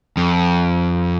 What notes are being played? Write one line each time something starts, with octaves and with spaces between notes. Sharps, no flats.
F2